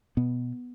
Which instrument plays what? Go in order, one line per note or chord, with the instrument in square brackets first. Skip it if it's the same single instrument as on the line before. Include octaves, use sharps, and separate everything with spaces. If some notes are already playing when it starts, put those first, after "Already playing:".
[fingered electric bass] B2 B3